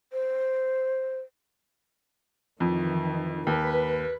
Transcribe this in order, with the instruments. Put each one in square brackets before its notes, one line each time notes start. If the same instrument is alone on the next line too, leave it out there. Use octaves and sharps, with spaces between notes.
[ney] C5
[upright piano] F2 [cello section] D#3 E3
[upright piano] D#2 [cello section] B4